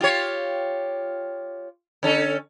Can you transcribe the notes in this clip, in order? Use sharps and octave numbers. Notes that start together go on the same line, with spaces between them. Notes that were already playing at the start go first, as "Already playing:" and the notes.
F4 G4 C#5
D3 C#4 A4